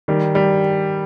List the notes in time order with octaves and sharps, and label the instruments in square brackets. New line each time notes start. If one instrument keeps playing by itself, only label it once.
[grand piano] D#3 [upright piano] G3
[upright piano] G3